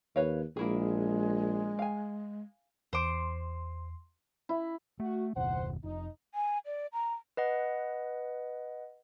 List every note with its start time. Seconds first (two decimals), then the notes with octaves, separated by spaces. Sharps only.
0.16 D#2 B4 C#5 F5
0.57 A#1 G#3 A#3 E4 G#4
1.79 F5 G#5
2.93 E2 C5 C6 D6
4.49 E4
5.00 A3 F#4
5.36 F#1 D#2 B2 C5 F#5
5.84 F1 D#4
6.35 G#5
6.66 D5
6.93 A#5
7.37 B4 D#5 F#5